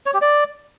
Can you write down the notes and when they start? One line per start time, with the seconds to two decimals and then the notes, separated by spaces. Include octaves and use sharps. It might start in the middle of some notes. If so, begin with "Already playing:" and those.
0.06 C#5
0.14 G4
0.21 D5